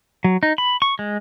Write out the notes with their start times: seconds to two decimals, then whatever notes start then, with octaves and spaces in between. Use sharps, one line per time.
0.24 F#3
0.43 D#4
0.58 B5
0.82 C#6
0.99 G#3